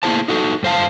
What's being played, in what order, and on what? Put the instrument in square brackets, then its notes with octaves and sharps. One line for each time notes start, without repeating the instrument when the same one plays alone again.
[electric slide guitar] A#3 B3 E4 G#4 C5 A5
D#4 F#4 A4
G2 C5 F5 A5